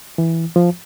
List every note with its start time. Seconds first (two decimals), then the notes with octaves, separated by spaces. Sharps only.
0.18 E3
0.56 F3